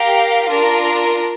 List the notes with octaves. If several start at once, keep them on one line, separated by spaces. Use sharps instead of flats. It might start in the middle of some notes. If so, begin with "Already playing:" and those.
Already playing: G4 A#4 F5
D4 F4 A#4